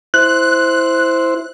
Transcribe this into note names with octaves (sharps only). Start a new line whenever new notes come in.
E4 C5 F#6